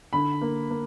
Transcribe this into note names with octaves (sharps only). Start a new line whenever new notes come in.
D3 B5
A#3
A#3